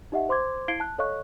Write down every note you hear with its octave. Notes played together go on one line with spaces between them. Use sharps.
D#4 G4 D#5 E5 F#5
C5 C6 D6 G#6
E4 F5 G#6 C7 D7 G7
A5 F#6
A4 C#5 D#5 F5 C#6 F#6